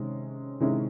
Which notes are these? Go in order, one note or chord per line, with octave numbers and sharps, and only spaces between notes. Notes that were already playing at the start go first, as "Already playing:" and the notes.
Already playing: C3 D#3 G#3 C#4
C3 D#3 G#3 C#4 E4